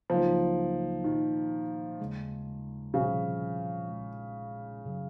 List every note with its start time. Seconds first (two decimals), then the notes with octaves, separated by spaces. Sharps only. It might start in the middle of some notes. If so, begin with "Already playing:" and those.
0.10 C#2 C#3 F3 F#3 A#3 D#4
1.04 A#2 D#3 F3 A#3
1.99 D#2 C#3 G#3
2.94 C2 A#2 C#3 F3
3.88 A#1 A#2 G#3
4.84 F#2 C#3 F#3